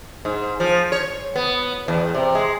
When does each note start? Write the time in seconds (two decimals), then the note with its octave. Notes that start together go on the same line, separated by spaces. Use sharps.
0.25 G#2
0.60 F3
0.92 C#5
1.36 B3
1.88 E2
2.15 C3
2.35 G#3